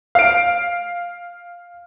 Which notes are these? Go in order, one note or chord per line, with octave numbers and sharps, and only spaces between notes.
F5 D7